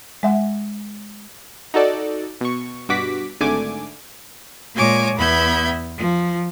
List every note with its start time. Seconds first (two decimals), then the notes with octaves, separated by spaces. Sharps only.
0.23 G#3 E5 F#5
1.74 D#4 F#4 A4 D5
2.41 B2 C#6
2.89 G2 B2 F#4 D6 B6
3.40 G#1 D3 A3 G#5 D6
4.73 A#2 G#3 C#5 G#5 D6
5.16 E2 B3 E5 B5 G6 G#6
5.96 F3